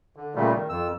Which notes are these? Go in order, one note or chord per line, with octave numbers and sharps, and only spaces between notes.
D3
A#2 C#3 G3 A3
D#3
F2 E6